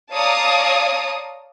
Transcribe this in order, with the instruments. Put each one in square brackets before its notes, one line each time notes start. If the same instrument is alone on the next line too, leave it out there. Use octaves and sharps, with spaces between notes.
[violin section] C#5 D5 F5 A5 A#5 D#6